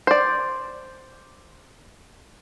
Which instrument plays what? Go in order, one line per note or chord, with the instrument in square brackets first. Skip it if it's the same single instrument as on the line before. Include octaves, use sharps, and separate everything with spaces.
[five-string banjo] C5 D5